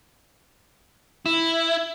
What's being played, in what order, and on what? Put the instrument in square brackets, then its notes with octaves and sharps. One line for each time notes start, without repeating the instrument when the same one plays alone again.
[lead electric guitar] E4